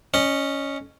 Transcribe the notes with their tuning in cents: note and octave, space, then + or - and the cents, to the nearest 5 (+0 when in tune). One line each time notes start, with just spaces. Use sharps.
C#4 +0 D#5 -25